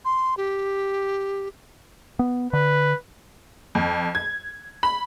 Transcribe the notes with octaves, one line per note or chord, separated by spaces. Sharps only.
C6
G4
B3
D3 B4
F2
G#6
B5